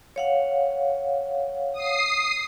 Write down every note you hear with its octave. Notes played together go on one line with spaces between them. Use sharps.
C#5 F5 F#5
D#6 C7